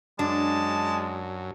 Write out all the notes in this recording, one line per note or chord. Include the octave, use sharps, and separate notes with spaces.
F#2 G#3 D4 A5